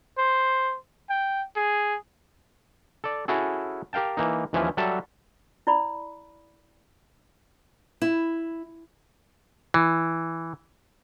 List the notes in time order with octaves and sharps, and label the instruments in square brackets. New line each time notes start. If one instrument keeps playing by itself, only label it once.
[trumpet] C5
G5
G#4
[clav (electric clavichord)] A4 D5
C#4 E4 F#4 G#4 A4
G4 A#4 F5 G5 A5
E3 A#3 D#4
D#2 E3 F3 C#4 E5 G#5
F#3 G3 F#4 A4 E5 A5
[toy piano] E4 D5 B5
[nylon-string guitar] E4
[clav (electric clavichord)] E3